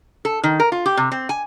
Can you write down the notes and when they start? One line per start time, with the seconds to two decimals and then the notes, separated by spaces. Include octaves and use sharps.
0.25 A4
0.43 D#3
0.60 A#4
0.72 F4
0.86 G4
0.97 C3
1.12 C4
1.29 G#5